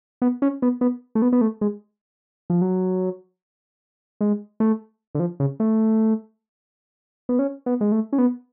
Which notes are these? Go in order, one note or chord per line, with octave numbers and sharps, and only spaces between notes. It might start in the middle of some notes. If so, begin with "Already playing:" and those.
B3
C#4
B3
B3
A3
B3
B3
A3
G#3
F3
F#3
G#3
A3
D3
F3
C#3
A3
B3
C#4
B3
G#3
A3
C#4
B3